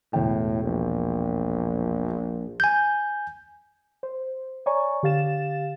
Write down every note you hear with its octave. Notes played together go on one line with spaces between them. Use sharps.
E1 A2 G5
A#1
G#5 G6
C5
C#5 D5 G#5 A#5 C#6
D3 G4 F5 A6 E7